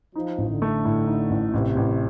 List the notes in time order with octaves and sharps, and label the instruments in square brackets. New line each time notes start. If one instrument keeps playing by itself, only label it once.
[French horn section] F3 [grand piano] D#4
[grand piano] A1
[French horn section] D3
[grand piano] A3
A2
D#4
A1
[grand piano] A1 [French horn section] C3
[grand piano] A1